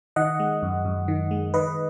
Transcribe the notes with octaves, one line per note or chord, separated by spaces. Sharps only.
D#3 D#5 F#5
G#3
F#2
F#2
D#3
G#3
D#3 B4 D#5